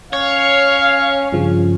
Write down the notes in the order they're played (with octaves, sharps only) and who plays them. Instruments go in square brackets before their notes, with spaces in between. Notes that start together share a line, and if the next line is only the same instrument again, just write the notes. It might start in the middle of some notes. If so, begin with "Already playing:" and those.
[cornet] C#4 [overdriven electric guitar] C#5 [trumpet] F5
[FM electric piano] G2 C#3 F3